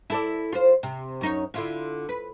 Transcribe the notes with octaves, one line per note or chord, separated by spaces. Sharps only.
E4 A4 D5
F4 C5
C3
F#2 D#4 C#5
D3 E4 F4
B4